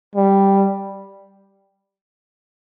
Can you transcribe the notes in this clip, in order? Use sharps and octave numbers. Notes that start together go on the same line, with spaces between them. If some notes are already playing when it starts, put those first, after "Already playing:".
G3